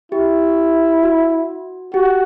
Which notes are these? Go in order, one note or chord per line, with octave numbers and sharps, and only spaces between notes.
E4 G4
F#4
F#4 G4